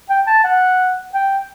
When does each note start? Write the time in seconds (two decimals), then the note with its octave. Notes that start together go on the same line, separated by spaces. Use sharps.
0.09 G5
0.27 A5
0.44 F#5
1.14 G5